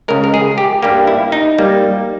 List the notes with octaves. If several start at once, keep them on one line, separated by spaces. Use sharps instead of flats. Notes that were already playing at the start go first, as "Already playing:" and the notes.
C#2 C#3 G#3 A#4
A#4
G#4
G4
G2 G3 A#3 G4
E4
D#4
G3 A#3